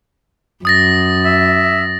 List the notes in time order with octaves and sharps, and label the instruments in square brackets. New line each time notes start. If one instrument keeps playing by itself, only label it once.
[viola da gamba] F#2 [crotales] D#6 A6 A#6
[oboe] E5